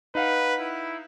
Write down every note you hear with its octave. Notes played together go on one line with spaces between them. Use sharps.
D#4 B4 F5 F#5
E4